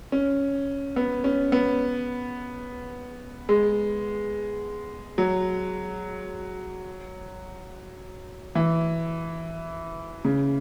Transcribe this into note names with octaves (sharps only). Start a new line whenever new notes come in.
C#4
B3
C#4
B3
G#3
F#3
E3
C#3